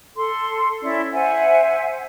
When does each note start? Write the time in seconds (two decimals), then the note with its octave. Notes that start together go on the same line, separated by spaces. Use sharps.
0.16 A4 C6
0.82 C#4 E4 D5
1.13 C5 E5 F#5 G#5